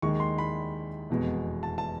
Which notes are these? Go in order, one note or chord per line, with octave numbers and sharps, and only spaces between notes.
D#2 D#3 G#3 C#6
C6
B5
F1 E2 B2 G#3
A5
A5